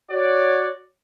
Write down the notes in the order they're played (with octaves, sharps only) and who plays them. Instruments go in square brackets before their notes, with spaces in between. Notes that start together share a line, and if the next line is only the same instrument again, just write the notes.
[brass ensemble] F#4 C#5 D5